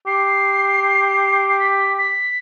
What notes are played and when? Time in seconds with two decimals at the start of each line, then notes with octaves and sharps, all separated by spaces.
0.06 G4 C7
1.49 C7
1.60 B6
1.98 B6